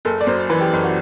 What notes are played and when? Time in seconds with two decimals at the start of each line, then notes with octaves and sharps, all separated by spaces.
0.05 F#1 A4
0.21 D5
0.27 F#2 C5
0.50 E3 B4
0.61 G4
0.73 F#1
0.84 F#4